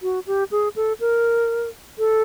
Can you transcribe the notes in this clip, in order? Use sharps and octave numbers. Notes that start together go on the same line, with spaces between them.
F#4
G4
G#4
A4
A#4
A4